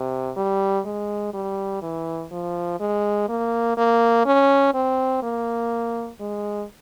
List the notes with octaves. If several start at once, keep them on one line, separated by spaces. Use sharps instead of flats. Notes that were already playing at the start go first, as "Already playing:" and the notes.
Already playing: C3
G3
G#3
G3
E3
F3
G#3
A#3
A#3
C#4
C4
A#3
G#3